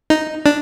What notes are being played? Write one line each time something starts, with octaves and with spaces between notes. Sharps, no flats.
D#4
D4